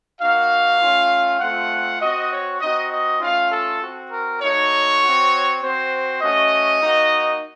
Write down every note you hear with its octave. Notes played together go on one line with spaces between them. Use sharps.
A#3 D#4 F#4 F5
A3 C#4 F4
A3 C4 F4 F#5
C4 F#4 D#5
C#5
C4 D#4 F#4 D#5
D#5
A3 C#4 F4 F5
A4
C4 F#4
A#4
A3 D#4 F#4 C#5
C4 F#4
C4 F#4 C5
A3 C#4 F#4 D#5
A#3 D#4 F#4